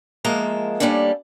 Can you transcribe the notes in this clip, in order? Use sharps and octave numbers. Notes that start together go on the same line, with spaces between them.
F3 G#3 A#3 E5 A5 A#5
G3 A#3 C#4 D4 A4